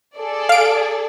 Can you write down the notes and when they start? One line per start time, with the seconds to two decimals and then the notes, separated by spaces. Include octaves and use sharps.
0.16 G#4 A4 D5
0.49 F5 D7